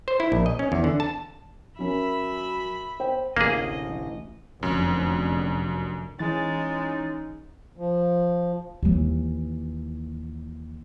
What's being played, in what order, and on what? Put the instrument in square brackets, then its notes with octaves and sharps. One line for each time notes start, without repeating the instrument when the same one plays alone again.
[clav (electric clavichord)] C5
E4
A#1
D#5
C#4
E2
D3
A5
[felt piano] F#3 C#4 A#4 [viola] E5 B5
[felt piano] C5 G5
[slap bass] A1 D2 C3 [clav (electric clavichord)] A#3 G#4 [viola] D#5 [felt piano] F5
[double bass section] F1 D3 [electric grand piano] F#2
[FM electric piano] E3 A6 [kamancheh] G#3 [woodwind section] C#4 D#4
[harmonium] F3
[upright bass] D#2 E3